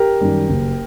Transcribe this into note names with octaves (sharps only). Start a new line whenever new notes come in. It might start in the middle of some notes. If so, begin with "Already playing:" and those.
Already playing: G4 A#4
F#2 D#3 G3
F#1